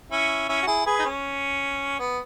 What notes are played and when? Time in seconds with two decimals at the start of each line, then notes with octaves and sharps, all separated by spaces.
0.11 C#4 E4
0.49 C#4 E4
0.63 F#4
0.67 E4 G#4
0.85 G#4 B4
1.00 D#4
1.05 C#4
1.99 B3